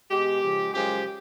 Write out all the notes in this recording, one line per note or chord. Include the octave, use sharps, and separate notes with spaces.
B2 G#3 G4
C#3 F3 G#3
F#2 C#3 F3 G#3 G4